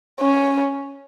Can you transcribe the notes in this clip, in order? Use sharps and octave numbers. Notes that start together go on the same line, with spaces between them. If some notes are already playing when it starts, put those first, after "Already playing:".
C#4